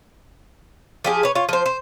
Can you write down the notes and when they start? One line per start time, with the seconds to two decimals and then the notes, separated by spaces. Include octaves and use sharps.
1.04 F3 G4 G#4
1.23 B4 C#5
1.35 F4 C#5
1.49 F3 C5
1.66 C5